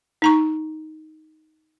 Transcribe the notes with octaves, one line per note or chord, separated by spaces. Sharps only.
D#4 A#5 C#6